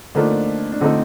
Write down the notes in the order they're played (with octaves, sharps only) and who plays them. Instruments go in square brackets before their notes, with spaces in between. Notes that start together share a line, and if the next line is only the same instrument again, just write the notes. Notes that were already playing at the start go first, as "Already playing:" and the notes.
[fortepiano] D3 F3 A3 D#4 A4 [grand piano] A#3 D4
[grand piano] D4
[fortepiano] D3 F3 A3 D#4 A4 [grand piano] C4